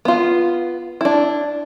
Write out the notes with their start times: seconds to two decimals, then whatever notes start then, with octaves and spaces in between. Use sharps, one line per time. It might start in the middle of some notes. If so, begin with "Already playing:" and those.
0.05 B3 F4
1.01 D4 E4